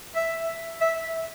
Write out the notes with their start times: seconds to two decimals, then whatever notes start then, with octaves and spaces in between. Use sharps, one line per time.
0.16 E5
0.81 E5